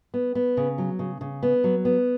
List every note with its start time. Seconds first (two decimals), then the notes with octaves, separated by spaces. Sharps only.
0.14 B3
0.35 B3
0.57 C#3
0.78 F#3
0.99 C#3
1.21 C#3
1.43 B3
1.64 F#3
1.85 B3